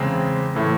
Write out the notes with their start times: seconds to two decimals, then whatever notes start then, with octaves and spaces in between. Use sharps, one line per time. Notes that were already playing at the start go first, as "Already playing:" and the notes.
Already playing: E2 C#3 G#3 C4
0.55 A2 E3 A3